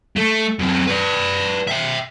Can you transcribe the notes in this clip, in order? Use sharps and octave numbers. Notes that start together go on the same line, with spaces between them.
A3
F#2 C4
B4 D5
E5 G5